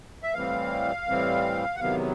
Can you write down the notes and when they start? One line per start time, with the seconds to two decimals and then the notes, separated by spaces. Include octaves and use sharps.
0.23 E5
0.34 A2 E3 G3 C4 F5
1.07 A2 E3 G3 C4
1.76 F#5
1.79 E2 C3 D#3 F#3 B3 F5